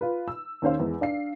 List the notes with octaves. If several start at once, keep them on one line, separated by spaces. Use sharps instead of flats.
F4 B4
E6
D#2 C#4 C5 F5
E2 G#3
D4 F5 C7